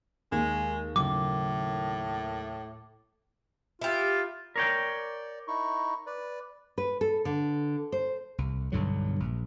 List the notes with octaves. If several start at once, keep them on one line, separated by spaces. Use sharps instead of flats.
D#2 G#3
A2 C#3 F#3 D6
E4 F4 G4
A#4 C#5 D5 G5
D#4 E4 C#6
B4 D5
B4
A4
D3
C5
C2
B1 G2 D3 F#3
A#1